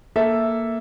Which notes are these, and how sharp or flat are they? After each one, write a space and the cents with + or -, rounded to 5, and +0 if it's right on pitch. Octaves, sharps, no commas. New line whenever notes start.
A#3 +0 A4 +0 E5 +0